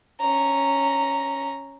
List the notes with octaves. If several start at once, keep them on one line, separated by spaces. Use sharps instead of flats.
C#4 A#5